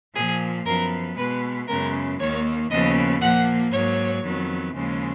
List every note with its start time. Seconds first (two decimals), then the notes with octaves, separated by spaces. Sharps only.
0.15 A#2 F3 A#3 G#4
0.65 F#2 F3 B3 A#4
1.17 B2 G#3 B3 B4
1.68 F#2 C#3 G#3 B3 A#4
2.19 D#2 D#3 A#3 C#5
2.70 D#2 C#3 F3 B3 D#5
3.21 A#2 F3 A#3 F#5
3.72 G#2 F#3 A#3 C#5
4.24 F2 D#3 F#3 B3
4.75 D#2 C#3 F3 G#3